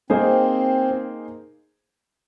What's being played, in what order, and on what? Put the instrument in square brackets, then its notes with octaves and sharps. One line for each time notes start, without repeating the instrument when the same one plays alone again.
[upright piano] A#3 D#4 G#4 C5 [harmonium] C4